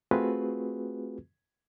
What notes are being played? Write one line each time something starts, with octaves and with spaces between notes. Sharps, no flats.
A3 C4 F4 F#4 G#4 B4